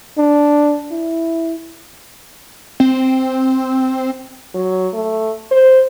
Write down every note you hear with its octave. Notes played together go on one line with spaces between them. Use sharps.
D4
E4
C4
F#3
A3
C5